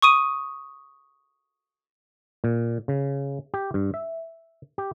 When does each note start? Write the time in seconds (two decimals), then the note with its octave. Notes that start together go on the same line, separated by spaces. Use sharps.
0.02 C#6 D#6 D#7
2.44 A#2
2.88 C#3
3.54 G4
3.74 G2
3.94 E5
4.78 G4